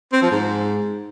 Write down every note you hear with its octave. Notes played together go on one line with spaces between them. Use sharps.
C4
F3
G#2